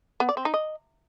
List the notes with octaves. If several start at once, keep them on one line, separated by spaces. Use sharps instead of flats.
B3
D5
C4
D#4
D#5